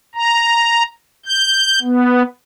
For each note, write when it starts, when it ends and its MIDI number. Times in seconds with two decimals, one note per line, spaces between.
0.15 0.83 82
1.26 1.79 91
1.82 2.23 59